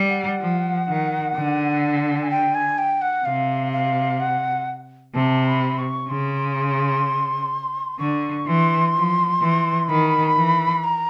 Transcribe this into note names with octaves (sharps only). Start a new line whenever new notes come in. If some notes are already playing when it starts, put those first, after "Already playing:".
Already playing: G3
F#5
F3
D#3
D3
G#5
G5
G#5
G5
F#5
C3 F5
F5
F#5
C3 A5
B5
C#6
C#3 C6
D3 C#6
E3 C6
F3
E3
D#3 B5
E3
A#5